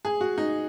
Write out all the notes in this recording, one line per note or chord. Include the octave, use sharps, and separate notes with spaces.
G#4
F#4
D#4